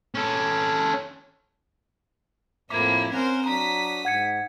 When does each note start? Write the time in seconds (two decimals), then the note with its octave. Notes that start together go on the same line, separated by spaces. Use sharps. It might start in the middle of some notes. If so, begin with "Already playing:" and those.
0.15 C#4 A4
2.70 F2 A2 F3 A#3 E4 D6 G#6
3.13 C4 C#4 A#4 C5 F#5
3.46 F#3 D4 A#5 D#6 B6
4.05 G#2 F#5 G#6 C#7